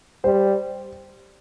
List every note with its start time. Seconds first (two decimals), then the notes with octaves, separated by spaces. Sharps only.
0.24 G3 C5